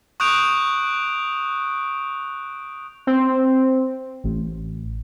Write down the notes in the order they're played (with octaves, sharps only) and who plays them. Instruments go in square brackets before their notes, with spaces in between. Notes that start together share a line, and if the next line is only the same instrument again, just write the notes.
[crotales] C#6 D#6 F#6 G6 D7 F7
[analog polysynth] C4
A1